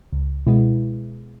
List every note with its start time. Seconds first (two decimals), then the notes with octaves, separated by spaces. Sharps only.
0.12 C#2
0.47 B2 G#3 B3 E4